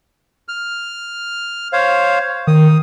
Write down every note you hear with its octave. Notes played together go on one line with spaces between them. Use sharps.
F6
C5 C#5 F5
D#3 D#6